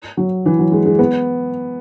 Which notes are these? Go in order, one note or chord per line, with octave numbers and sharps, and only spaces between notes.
F#3
E3
F#3
G#3
G#3
B3